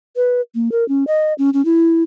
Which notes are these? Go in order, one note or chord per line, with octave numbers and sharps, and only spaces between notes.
B4
A#3
A#4
C#4
D#5
C#4
C#4
E4